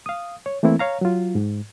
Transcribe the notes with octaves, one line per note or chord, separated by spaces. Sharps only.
F5 D#6
C#5
E3 A3 A#3 C4 E4
C#5 F5 A#5
F#3 F4
G#2